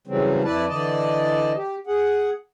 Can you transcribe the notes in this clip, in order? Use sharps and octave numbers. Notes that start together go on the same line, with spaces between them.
C#3 E3 F#3 G3 C4
F2 E4 B4 D5 A5
D3 E3 D5 D#5 A5
G4
G#4 F#5